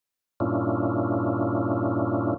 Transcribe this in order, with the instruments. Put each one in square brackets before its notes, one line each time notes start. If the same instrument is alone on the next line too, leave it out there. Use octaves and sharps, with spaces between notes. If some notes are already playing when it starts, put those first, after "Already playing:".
[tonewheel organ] G2 A#2 C#4 D4 E4 F4